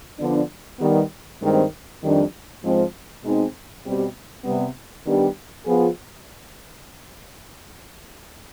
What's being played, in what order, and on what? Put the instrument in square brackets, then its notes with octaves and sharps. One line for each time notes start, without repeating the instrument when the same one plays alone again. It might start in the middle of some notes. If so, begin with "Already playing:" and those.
[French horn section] D3 F3 B3 D4
D#3 G3 B3
G2 D#3 G#3 C4
F2 D#3 G3 D4
G#2 F3 G#3 C4
B2 G#3 C4 D#4
B2 G3 C4 G4
C3 G3 B3
D#3 G3 B3 D4 G4
F3 B3 F4 G#4